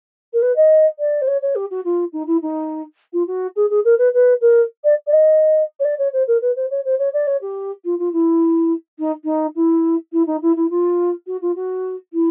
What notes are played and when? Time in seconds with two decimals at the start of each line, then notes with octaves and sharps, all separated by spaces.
0.33 A#4
0.42 B4
0.56 D#5
0.99 D5
1.21 C5
1.27 C#5
1.42 C#5
1.55 G4
1.71 F#4
1.84 F4
2.13 D#4
2.27 E4
2.42 D#4
3.13 F4
3.27 F#4
3.56 G#4
3.70 G#4
3.85 A#4
3.98 B4
4.14 B4
4.41 A#4
4.84 D5
5.07 D5
5.13 D#5
5.80 C#5
5.85 D5
5.98 C#5
6.13 C5
6.27 A#4
6.41 B4
6.56 C5
6.71 C#5
6.85 C5
6.99 C#5
7.14 D5
7.27 C#5
7.41 G4
7.84 F4
7.99 F4
8.13 E4
8.99 D#4
9.24 D#4
9.55 E4
10.12 E4
10.27 D#4
10.42 E4
10.56 E4
10.70 F4
11.27 F#4
11.42 F4
11.55 F#4
12.13 E4